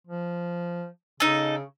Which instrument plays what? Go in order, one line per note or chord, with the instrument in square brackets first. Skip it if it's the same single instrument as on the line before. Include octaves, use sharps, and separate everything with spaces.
[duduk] F3
[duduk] C#3 [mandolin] D#4 A4